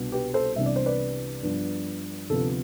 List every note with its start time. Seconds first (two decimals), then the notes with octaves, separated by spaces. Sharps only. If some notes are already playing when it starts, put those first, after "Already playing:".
Already playing: C2 B2 B3 D4
0.12 G4 B4
0.34 A4 C5
0.56 C2 C3 E3 B3 D4 E5
0.66 D5
0.76 C5
0.86 B4 D5
1.43 G2 F3 B3 D4
2.30 D2 C3 F3 B3 A4